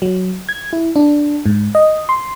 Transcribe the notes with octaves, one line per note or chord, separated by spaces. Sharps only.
F#3
G#6
E4
D4
G#2
D#5
C6